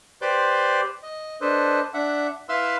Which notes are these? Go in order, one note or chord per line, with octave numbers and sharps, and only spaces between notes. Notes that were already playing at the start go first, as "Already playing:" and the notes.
G4 B4 C5 D5 C6 D6
D#5
D4 A4 B4 C5 D#5
D4 E5 F#5
E4 B4 E5 F5 C6 E6